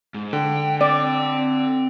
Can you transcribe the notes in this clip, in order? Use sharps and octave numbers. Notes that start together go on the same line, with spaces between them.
G#2
D3 G5
C4 D5 G5